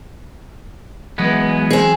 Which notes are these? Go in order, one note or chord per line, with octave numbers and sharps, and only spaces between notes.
E3 F#3 G#3 B3 B4
C4 G#4